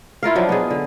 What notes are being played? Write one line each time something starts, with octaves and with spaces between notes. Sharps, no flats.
E4 F4 A#4 F5
F3 F#3 D4 D#4
B3 D#4 G#4
D3